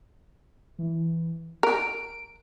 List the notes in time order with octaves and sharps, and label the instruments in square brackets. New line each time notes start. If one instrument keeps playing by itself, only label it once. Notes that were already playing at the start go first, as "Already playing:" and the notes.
[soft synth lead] E3
[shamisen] A#4 [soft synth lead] D7